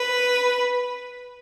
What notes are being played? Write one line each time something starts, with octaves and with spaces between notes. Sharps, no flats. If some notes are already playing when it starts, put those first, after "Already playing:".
Already playing: B4